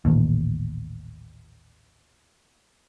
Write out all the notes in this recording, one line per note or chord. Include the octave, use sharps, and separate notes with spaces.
D#1 A1 D#2